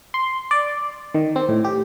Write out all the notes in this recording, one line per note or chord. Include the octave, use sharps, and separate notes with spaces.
C6
D5
D#3
C4
A2
G4